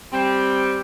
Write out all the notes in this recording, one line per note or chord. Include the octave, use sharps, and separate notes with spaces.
G3 C4